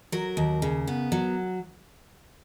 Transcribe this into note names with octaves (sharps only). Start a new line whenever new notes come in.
F#3 A#4
D#2
C#3
B3
F#3